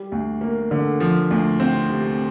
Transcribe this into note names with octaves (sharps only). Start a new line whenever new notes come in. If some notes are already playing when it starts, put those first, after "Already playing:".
Already playing: G3
D2
A#3
D3
F3
D2
C4
C3